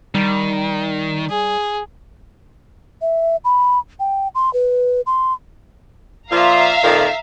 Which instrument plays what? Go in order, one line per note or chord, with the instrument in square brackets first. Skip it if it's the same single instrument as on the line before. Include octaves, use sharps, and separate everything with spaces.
[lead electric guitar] D#3 [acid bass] G3
[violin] G#4
[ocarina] E5
B5
G5
C6
B4
C6
[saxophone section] A#2 F3 F4 [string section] E5 F5 A#5
[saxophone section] F2 A#2 D#3